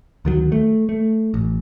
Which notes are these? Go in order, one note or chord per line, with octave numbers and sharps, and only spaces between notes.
D2 D#3 F#3
A3
A3
A1